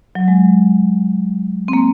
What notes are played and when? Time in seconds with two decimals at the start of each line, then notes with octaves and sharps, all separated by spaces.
0.15 F#3
0.28 G#3
1.68 C4
1.73 A#3